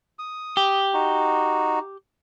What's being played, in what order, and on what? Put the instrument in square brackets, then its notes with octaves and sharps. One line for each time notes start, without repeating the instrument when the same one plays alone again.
[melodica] D#6
[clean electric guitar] G4
[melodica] D#4 F#4